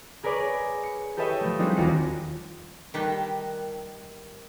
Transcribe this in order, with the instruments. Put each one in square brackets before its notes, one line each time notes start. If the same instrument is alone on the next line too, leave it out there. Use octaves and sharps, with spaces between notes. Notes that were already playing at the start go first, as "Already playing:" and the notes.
[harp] G#4 A#4 B4 C#5 D5
C#7
G4 A4 B4 C#5 D#5 E5
F3 A3
G3 C4 D4 D#4 F4 G#4
E1 D#2 F4 F#4 C#7
[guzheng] D#3 G3 B4 G5 A5